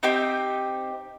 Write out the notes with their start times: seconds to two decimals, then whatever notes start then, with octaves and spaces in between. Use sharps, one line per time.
0.03 C4 D#4 G4